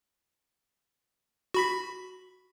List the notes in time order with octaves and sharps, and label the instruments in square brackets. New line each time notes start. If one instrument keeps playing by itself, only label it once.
[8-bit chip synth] F#4 B5 B6